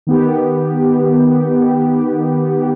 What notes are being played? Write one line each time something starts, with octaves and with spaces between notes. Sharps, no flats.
D#3 B3 G4